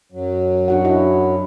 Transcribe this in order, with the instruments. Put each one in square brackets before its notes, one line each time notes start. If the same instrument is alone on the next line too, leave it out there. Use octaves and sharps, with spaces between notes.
[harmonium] F#2 F#3
[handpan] D4 F#4 F#5
E4 F#4 D#5